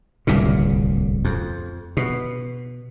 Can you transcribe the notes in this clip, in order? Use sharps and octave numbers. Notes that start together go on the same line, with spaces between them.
D1 C2 A#2 C#3
F2
B2